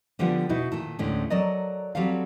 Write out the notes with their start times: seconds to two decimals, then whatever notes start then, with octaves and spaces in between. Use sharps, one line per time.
0.19 D3 F3 G3 B3 F4 F#5
0.49 B2 D#4 E4 F#4
0.72 A#2 D#3 A4
0.99 D2 A2 D3 G#3 C#4
1.30 F#3 A4 A#4 D5 D#5
1.95 F#3 G3 C4 A4 F5